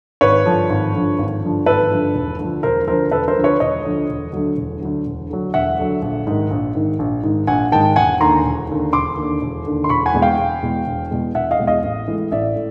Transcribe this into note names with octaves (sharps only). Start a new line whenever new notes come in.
G#1 B4 C#5
G2 D3 F3
G#1
G2 D3 F3
G#1
G2 D3 F3
G#1 A4 B4
G2 D3 F3
E1
D2 D3 F3
E1 A#4 C5
D2 D3 F3 A#4 C5
E1 A4 B4
A#4 C5
D2 D3 F3
B4 C#5
E1 C#5 D#5
D2 D3 F3
E1
D2 D3 F#3
E1
D2 D3 F#3
E1
D2 D3 F#3
E1 E5 F#5
D2 D3 F#3
A#1
G#2 D#3
A#1
G#2 D#3
A#1
G#2 D#3
A#1 F#5 G#5
G#2 D#3 G5 A5
E1 F#5 G#5
D#2 D3 A#5 C6
E1
D#2 D3
E1 C6 D6
D#2 D3
E1
D#2 D3
C6
E1 B5 C#6
F#5 G#5
E2 B2 G#3
F5 G5
E1
E2 B2 G#3
E1
E2 B2 G#3
E1 E5 F#5
D#5 F5
E2 B2 G#3
D#5 F5
A1
A2 E3 G#3
A1 D5 E5
A2